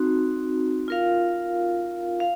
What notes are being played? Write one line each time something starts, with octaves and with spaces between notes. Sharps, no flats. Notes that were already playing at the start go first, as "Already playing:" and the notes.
Already playing: C4 D#4 F#4
F4 A#4 F5
F5